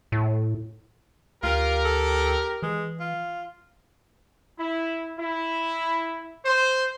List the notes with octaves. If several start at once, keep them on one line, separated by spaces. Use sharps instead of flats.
A2
D2 F4 G4 A#4
A4
E3 G#3
F4
E4
E4
C5